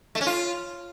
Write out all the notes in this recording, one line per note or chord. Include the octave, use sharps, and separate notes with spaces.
A3
C#4
F4